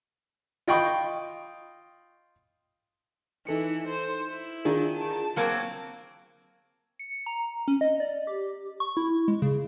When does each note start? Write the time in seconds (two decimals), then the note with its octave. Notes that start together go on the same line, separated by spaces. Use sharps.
0.68 F4 D#5 G5 B5 C#6
3.47 E3 D#4 A4 C#7
3.88 C5
4.29 E4
4.65 D#3 D4 F4 G#4
4.96 A5
5.36 F#3 A#3 C4
6.99 C#7
7.26 A#5
7.68 C#4
7.81 D#5
8.00 D5
8.27 G4
8.80 C#6
8.97 E4
9.28 G#3
9.42 C#3